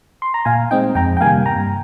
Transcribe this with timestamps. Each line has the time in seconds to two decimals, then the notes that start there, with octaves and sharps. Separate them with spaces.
0.22 C6
0.34 A#5
0.45 A#2 F5 G#5
0.71 G#3 C4 D#4 D#5 G5
0.95 F2 G5 A#5
1.17 G5
1.21 C3 D#3 G3 A#3 F5 G#5
1.46 G2 G5 A#5